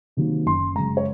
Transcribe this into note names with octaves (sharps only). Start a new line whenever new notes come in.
C3 D#3 F#3 A#3
F#1 C6
F#2 C#3 G#3 A#5
C#5